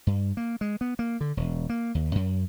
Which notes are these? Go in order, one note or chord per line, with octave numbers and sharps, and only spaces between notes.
G2
A#3
G#3
B3
A#3
D3
E1
A#3
D#2
F#2